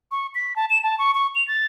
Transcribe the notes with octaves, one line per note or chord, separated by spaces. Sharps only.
C#6
B6
A5
E7
A5
C#6
C#6
F7
A6